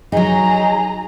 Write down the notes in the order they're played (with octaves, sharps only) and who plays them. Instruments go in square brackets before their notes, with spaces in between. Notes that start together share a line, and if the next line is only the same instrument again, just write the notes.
[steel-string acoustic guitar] F#3 D#4 [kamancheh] G#4 A#5